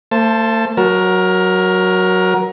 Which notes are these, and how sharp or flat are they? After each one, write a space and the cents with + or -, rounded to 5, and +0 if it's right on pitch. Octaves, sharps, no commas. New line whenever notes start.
A3 +45 C5 +10 A5 +0
F#3 +0 F#4 +0 A#4 +20